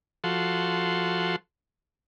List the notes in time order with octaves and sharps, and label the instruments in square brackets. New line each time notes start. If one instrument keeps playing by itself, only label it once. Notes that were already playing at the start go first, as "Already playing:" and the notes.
[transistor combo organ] F3 F#4 A4 C6